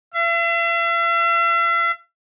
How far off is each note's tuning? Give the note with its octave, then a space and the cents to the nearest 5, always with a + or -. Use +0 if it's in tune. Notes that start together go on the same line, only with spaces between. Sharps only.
E5 +45